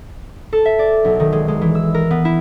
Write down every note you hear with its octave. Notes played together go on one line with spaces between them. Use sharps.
A4
E5
D5
B1
D#3
G#3
G#3
E3
E6
A#4
B3
E4